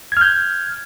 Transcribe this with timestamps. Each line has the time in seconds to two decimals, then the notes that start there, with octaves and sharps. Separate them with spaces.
0.12 G#6
0.17 F6
0.21 G6